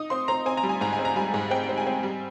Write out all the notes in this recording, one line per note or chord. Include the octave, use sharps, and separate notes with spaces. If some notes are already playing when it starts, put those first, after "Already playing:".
Already playing: D#4 D#6
C4 C6
C4 A#5
C4 G#5
A#5
G3
G#5
G#2 A#5
G#5
C4
A#5
G3 G#5
G#2
C4 G5
C4
G#5
C4
G3